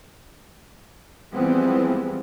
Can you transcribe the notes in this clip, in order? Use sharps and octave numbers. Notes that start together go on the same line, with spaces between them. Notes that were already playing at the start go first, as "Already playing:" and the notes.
E3 F3 G3 G#3 B3 C4